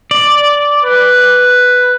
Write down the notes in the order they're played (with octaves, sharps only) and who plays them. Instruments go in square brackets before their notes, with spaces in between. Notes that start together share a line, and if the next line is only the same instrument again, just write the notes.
[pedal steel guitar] D5
[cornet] B4